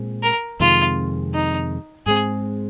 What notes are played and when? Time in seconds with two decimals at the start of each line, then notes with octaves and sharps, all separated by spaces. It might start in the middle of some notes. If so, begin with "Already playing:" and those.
Already playing: A#2 G#3 C4
0.23 A#4
0.60 F2 C3 D#3 G#3 F4
1.34 D#4
2.06 G#2 G#3 C4 G#4